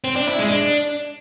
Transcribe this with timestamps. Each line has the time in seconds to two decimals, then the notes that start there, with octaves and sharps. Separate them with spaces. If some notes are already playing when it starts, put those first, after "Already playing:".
0.04 C4
0.16 D4
0.27 E4
0.39 G#3
0.50 D4